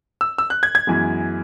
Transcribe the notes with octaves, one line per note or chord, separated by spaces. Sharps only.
E6
E6
F#6
G#6
G#6
F#2 E3 G#3 B3